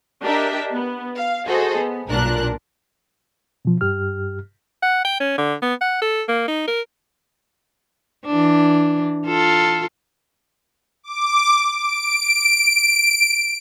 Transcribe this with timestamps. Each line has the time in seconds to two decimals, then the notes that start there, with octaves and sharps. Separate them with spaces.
0.22 D4 G4 A#4 D#5 E5
0.71 B3
1.16 F5
1.47 F#4 G#4 A4 C5 D#5
1.77 B3
2.08 B1 G2 A#2 D4 A#4 F#6
3.65 B2 F3
3.81 G2 G4 F6
4.82 F#5
5.05 G5
5.20 C#4
5.38 D3
5.62 B3
5.81 F#5
6.02 A4
6.28 A#3
6.48 D#4
6.67 A#4
8.26 E3 D4
9.27 F4 A4
11.03 D6
11.73 D7